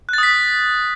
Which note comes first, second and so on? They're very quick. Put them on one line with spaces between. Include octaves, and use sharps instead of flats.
F#6 A6 D#6 B6